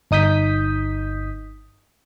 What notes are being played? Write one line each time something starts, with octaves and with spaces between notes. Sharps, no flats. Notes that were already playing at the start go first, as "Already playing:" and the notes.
G1 D#4 D#6 G6 B6